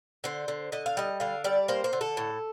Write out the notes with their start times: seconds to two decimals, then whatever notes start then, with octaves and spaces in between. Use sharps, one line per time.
0.24 D3 C5
0.48 D3
0.72 D3 D#5
0.86 F5
0.97 G3 D#5
1.20 D3 F5
1.44 G3 D5
1.68 A#3 C5
1.84 C5
1.93 D3
2.01 A4
2.17 A2